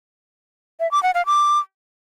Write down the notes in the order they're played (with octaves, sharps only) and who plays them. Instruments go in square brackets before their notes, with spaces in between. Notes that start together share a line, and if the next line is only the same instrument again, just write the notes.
[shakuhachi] E5
D6
F#5
F5
D6